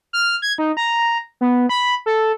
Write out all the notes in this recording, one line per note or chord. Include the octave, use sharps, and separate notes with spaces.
F6
G#6
D#4
A#5
B3
B5
A4